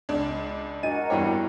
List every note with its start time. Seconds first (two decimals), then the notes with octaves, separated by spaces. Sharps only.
0.09 C#2 D4
0.83 D4 F#4 A#4 D#5 D#7
1.10 E2 G2 E4 C#5 G5 D6